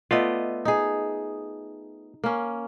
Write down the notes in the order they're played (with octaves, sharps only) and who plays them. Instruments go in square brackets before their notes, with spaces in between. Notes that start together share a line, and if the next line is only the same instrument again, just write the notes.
[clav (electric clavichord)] A3 B3 F4 [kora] D5 D#5
[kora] D#4 G#4
A#3 C#4